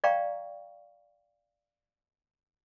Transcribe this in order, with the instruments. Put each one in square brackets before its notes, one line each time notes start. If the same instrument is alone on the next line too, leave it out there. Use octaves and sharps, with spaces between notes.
[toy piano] D5 F5 G5 A#5 C#6